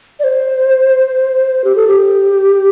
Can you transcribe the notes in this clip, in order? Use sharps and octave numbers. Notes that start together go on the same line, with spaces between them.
D5
C5
G4
A4
G4